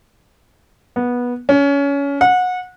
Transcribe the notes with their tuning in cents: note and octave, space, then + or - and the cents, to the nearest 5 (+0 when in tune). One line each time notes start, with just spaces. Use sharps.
B3 -15
C#4 +25
F#5 -25